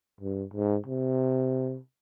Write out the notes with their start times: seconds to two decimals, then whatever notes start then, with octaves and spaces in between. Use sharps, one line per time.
0.21 G2
0.54 G#2
0.86 C3